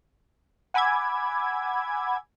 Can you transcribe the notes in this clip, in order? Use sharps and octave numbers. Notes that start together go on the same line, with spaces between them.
F#5 G#5 B5 D6 E6 G#6